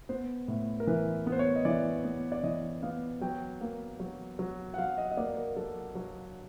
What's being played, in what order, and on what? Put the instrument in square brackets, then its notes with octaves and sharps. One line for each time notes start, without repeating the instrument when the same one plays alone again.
[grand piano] B3 C5
A2
A#4
E3 B4
B3
C5
C#5
D#5
E3 D5
B3
D5
E3 D#5
B3 F5
F#3 G5
A#3
F#3
F#3
F#5
F#3 F5
D#5
D#5
A#3 D5
A#4
F#3 A4
F#3